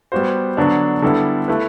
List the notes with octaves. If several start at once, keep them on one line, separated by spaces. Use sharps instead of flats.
G3 B3 F#4 C5
D3 F#3 B3 D4
D3 G3 B3 E4 A4
A3 E4 B4